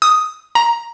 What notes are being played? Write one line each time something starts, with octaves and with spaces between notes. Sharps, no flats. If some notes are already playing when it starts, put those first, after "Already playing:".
D#6
A#5